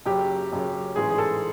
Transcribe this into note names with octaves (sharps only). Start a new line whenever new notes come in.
F#1 F#2 C#3 G4
F#1 F#2 C#3
A1 G#2 E3 G#3 G#4
G#4
A4